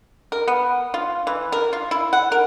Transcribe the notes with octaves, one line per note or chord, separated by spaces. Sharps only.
A#4
B3
F4
E3
A#4
F4
E4
F#5
A#4